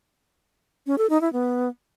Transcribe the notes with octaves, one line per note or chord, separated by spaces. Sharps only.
C#4
A4
D#4
E4
B3